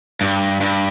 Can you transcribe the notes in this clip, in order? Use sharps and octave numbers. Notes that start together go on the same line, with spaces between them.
G2
G2